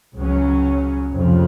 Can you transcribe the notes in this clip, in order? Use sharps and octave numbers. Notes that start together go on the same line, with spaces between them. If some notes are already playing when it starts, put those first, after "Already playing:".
C#2 C#3 F#3 C#4
F1 F2 C#3 F3